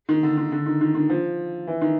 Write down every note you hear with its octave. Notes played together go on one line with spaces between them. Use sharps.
D#3
D3
D#3
D3
D#3
D#3
D#3
F3
E3
D#3